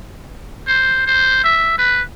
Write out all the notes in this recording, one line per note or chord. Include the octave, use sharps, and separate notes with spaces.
C5
C5
E5
B4